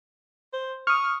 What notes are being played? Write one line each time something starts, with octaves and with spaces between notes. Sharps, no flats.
C5
C#6 D#6 F6